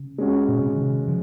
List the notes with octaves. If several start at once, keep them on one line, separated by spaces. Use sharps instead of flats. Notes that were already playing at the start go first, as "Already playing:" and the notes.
Already playing: C#3
G#3 C#4 F#4
A#2
C3
C#3
C3 D#3
C#3 F3